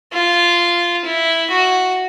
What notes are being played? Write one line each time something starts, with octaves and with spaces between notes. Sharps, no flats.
F4
E4
F#4